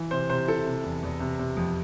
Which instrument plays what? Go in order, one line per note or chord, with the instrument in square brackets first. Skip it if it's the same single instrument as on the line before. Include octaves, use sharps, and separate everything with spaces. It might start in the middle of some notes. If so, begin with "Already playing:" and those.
Already playing: [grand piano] E3
C3 C5
C3 C5
E4 A4
C3
E2
E2
C3
C3
F2